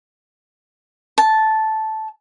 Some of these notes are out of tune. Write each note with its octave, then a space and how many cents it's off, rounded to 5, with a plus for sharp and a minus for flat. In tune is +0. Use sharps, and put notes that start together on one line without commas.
A5 -10